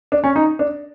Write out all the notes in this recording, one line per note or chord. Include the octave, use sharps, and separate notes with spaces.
D4
C#4
D#4
D4